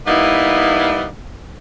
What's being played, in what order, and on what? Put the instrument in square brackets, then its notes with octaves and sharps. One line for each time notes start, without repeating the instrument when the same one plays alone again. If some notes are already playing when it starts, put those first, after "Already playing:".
[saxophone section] G3 A#3 B3 D#4 E4